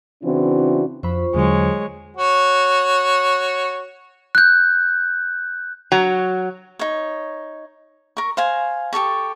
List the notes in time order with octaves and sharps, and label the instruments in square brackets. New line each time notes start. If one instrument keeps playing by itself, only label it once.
[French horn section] C#3 E3 C4 D4 E4 F#4
[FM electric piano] F2 F3 B5 [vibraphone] F4 C5 C#6
[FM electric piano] E2 D3 F#3 [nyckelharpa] G#3 C#5
[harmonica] F#4 C#5
[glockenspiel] F#6 G6
[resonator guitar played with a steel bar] F#3
[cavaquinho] D#4 C#5
A#4 C#6
C5 F5 G#5
G4 A4 A5 C#6